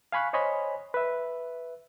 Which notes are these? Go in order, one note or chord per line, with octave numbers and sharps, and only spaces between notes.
F5 G#5 B5 C#6 F#6
C5 C#5 D#5 G#5 B5
B4 E5